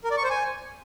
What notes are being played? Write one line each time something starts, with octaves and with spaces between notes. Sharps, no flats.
A#4
D5
C#6
C5
G#5